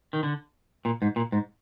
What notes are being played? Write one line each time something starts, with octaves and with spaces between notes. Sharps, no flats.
D#3
D3
A#2
G#2
A#2
G#2